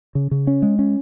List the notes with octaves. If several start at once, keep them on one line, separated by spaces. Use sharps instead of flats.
C#3
C#3
C#4
G#3
C#4